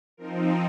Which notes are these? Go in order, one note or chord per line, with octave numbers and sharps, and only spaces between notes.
F3 C4 D#4 A#4